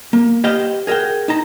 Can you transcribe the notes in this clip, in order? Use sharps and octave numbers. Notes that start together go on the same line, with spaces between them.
A#3
G4 B4 C5 D#5 F5 G5
G#4 A#4 E5 F#5 G5
D#4 A5 A#5